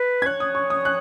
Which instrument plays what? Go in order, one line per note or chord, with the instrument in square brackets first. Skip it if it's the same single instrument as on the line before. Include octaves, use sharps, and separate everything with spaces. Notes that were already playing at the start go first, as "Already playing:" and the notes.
Already playing: [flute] B4
[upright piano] G#6
[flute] C#5 [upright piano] F#6
[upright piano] D#6
C#6
D#6
F#6